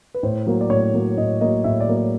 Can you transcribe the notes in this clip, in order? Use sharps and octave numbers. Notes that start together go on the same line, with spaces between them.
B4
A2 C5
F#3 A#3
D5
A2 C#5
F#3 A#3
A2 D#5
F#3 A#3 D#5
A2 E5
D5
F#3 A#3
D5